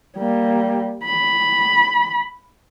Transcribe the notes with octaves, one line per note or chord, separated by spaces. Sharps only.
G3 A#3
B5